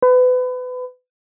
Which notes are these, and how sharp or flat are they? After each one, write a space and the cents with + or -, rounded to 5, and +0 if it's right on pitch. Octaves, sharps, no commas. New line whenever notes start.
B4 +30